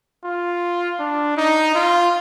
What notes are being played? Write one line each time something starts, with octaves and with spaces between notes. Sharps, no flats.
F4
D4
D#4
F4